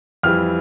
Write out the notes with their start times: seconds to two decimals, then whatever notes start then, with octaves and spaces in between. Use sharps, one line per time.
0.23 F2 E3 G3 F6